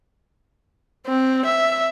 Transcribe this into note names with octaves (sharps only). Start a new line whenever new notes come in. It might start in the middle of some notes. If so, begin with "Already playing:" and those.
C4
E5